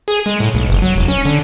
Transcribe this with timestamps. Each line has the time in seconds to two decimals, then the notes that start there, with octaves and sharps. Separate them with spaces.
0.08 G#4
0.26 G#3
0.40 A2
0.54 B1
0.68 F#1
0.82 F#3
0.96 E1
1.08 C#4
1.25 D3